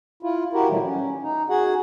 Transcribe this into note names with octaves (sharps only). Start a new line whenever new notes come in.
E4 F4
E4 F#4 G4 A#4
A#2 D#3 E3 F#3 G3 A3
C#4
D#4
F#4 G#4 F#5